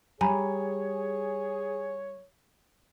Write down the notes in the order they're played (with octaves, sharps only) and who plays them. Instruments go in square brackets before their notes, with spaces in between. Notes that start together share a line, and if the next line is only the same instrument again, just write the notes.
[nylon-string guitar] G3 [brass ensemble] G#4 [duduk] C#5 [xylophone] G#5 A#5 B5